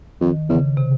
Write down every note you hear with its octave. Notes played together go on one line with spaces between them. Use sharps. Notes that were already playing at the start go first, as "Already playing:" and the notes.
F2 D#3
E2 C#3
C3